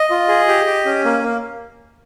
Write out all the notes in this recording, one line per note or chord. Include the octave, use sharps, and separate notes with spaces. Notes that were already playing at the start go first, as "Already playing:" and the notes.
Already playing: D#5
F4
G#4
G4
G4
C#4
A#3
A#3